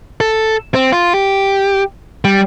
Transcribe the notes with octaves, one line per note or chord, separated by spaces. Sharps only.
A4
C4
F4
G4
G3